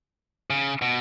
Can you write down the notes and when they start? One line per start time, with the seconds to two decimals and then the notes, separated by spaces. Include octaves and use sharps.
0.50 C#3
0.82 B2